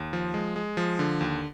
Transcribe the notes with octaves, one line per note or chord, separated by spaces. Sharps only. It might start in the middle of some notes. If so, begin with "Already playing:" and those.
Already playing: D#2
F3
G#3
G#3
F3
D3
D#2